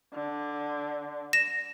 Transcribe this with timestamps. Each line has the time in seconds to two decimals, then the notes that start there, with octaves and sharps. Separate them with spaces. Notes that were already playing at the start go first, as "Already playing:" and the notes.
0.14 D3
1.33 A#6 E7